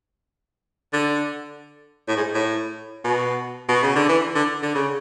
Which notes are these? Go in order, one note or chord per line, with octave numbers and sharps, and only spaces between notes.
D3
A2
G#2
A2
B2
B2
C#3
D3
E3
D3
D3
C#3